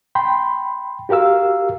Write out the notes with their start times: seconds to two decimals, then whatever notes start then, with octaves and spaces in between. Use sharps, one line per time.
0.15 G5 B5 C6
1.09 F#4 G4 A#4 F5 E6